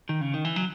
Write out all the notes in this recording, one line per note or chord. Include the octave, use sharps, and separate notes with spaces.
D#3
C#3
D#3
E3
F#3